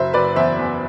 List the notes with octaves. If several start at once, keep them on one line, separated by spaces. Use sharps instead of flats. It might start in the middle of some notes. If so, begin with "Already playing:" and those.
Already playing: F#1 C5 E5
F#1 B4 D5
E2 C5 E5
E2